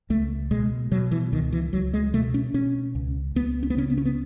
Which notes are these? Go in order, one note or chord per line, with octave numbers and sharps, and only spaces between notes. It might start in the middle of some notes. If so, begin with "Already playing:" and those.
C#2 A3
B2 G#3
B2 F#3
E3
C#2 D#3
E3
C#2 F#3
G#3
B2 A3
C#4
B2 C#4
C#2
C#2 B3
C#4
B3
C#3 C#4
B3
C#4
B3